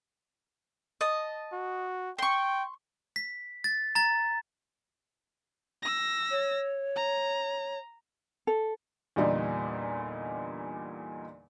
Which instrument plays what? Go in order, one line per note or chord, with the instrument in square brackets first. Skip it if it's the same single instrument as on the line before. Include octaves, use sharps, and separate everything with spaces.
[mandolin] D#5 A5
[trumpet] F#4
[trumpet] G5 [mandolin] C6 C#6
[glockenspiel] B6
A6
A#5 A6
[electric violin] E6 A#6
[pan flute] C#5
[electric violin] A#5
[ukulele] A4
[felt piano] E2 A#2 D3 G3 D#4